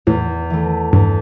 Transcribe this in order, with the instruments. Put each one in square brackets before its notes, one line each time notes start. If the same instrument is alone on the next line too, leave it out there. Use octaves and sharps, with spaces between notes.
[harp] E2 [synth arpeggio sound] A2
[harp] E3 A3
[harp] E2 [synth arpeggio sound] G2